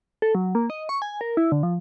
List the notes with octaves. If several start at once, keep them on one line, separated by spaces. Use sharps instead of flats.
A4
F#3
A#3
D#5
C#6
G#5
A#4
E4
D3
F3